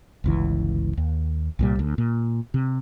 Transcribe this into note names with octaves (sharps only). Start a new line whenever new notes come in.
G1 C#2 E3
D#2
C2 A#2 G3
D2
A#2
C3